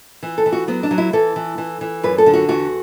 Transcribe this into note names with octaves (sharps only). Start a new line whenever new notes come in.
E3
A4
E3
F#4
F#3 B3
D4
F#3
E4
E3 A4
E3
E3
E3
F#2 B4
A4
D3
F#4
E2 F#4